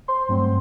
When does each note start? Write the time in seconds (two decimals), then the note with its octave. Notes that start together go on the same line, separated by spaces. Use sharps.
0.08 C5 C6
0.29 G2 F#3 A3 C4